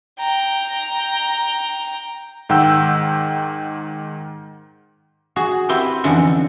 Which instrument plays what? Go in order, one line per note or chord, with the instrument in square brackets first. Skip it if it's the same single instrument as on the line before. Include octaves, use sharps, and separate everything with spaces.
[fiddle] G5 A#5
[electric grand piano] G#2 D#3 F#5 G5 E6 G6
[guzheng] F#4 G#4
C4 E4 F#4 G4 B4
F2 D3 E3 C#4